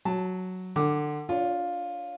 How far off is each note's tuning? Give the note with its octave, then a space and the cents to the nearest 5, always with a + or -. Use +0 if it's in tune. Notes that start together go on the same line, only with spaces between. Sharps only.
F#3 +0 A5 +0
D3 +25 D6 +0
D4 -20 F4 +10 C#5 +15